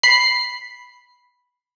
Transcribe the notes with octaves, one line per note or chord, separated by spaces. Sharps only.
B5 C7